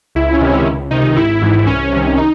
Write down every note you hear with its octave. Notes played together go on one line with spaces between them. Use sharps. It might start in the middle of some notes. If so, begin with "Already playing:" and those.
C#2 E4
C#4
C3 D#3
C#4
C#2
C3 D#3 D#4
G#1 E4
G#2 E3
C2 C#4
C3 D#3
D#4